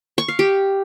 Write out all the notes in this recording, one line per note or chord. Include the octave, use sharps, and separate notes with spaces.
C#6
F5
G4